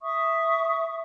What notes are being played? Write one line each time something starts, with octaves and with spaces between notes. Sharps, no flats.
E5 C#6 D#6